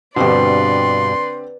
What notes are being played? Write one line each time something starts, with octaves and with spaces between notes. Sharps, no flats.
G2 B2 D3 C4 G4 B4 D5 C6